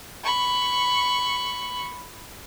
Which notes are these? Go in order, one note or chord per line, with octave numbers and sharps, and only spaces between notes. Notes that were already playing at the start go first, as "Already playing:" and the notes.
B5 C#6